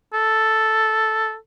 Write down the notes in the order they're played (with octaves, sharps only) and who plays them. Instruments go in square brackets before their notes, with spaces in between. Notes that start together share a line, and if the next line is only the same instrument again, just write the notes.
[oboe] A4